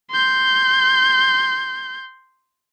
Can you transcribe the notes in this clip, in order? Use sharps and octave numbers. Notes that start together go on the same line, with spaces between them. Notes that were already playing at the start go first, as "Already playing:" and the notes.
C6 G6